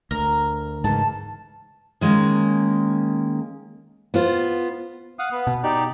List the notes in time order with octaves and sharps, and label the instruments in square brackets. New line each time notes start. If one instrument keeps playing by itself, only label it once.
[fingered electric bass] D2 [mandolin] A#4
[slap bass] G#2 C#3 E3 [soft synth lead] A5
[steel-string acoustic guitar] D#3 G#3 A#3 C#4
B3 F4 C5
[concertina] F5 F#5 D#6
B3
[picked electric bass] B2
[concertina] D#4 G4 D5